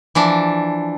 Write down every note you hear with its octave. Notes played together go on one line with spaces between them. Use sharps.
E3 F3 D4